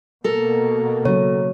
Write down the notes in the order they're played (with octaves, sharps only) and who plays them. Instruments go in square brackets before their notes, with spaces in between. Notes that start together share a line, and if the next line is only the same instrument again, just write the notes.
[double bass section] B2 A#3 [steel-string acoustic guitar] A4 A#4
[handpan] C#3 F#3 [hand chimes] C#5